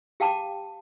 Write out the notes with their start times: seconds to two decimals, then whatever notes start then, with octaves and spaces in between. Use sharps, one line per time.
0.20 G4 F5 G5 A5 D6